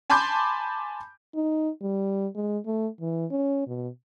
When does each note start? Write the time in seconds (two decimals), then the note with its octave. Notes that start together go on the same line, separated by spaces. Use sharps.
0.10 G#5 A5 B5 C6 D6 G6
1.35 D#4
1.82 G3
2.35 G#3
2.66 A3
3.00 E3
3.31 C#4
3.67 B2